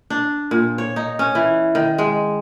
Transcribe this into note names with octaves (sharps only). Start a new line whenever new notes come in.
D4
A#2
C#5
D#4
C#4
E3
D#3
G#3